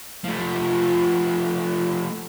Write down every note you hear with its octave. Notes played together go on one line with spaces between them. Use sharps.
F3 A3